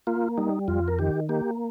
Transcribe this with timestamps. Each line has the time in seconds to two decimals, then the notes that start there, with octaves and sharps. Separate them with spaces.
0.07 A#3 F4
0.38 G3 D#4
0.68 F2 F4
0.88 A#4
0.99 D#3 G4
1.29 A#3 G4